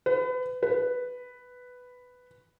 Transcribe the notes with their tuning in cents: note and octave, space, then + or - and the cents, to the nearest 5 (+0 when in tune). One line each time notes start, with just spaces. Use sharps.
B4 +30
B4 +5